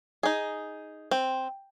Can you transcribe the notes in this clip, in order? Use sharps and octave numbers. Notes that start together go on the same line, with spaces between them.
D#4 G#4
C4